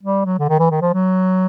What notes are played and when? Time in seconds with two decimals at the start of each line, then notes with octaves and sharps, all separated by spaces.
0.03 G3
0.25 F#3
0.39 D3
0.49 D#3
0.59 E3
0.71 D#3
0.81 F3
0.93 F#3